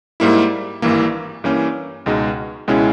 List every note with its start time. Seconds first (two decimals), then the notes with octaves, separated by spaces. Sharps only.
0.20 G#2 G3 A#3 E4
0.82 G#1 G2 E3 A#3
1.44 G2 E3 A#3 C#4
2.06 C#2 B2 G#3 D#4
2.68 C#2 B2 G#3 C#4 E4